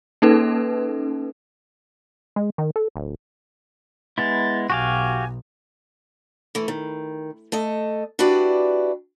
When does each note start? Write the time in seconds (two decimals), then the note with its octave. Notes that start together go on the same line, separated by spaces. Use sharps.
0.22 A#3 C#4 D#4 A4 B4
2.36 G#3
2.58 D#3
2.76 A4
2.96 D1
4.18 G#3 B3 E4 A6
4.70 B1 F#4 G4 F5 G#5
6.55 E3 A3
6.68 D#3
7.52 A3 A4 D#5
8.19 D4 E4 F#4 G4 B4 D5